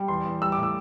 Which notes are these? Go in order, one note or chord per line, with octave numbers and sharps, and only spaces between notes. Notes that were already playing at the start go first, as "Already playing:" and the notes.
Already playing: G3
E2 C6
E2
G3 E6
D6
A2
E6